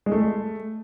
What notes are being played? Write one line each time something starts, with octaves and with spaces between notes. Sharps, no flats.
G#3
A3